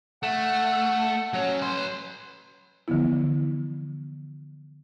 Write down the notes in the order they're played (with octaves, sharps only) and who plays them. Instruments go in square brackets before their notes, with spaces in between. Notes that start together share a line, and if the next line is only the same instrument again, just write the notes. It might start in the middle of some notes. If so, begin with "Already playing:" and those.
[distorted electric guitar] A3 [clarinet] F#5
[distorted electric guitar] F#3 C#5 [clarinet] C#4
[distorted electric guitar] B4 C6
[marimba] D3 E3 F3 B3 E4